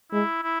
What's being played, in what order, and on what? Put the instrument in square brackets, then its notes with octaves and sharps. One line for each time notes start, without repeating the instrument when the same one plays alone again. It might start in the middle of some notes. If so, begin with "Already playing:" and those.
[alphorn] G#3 [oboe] E4
[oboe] E4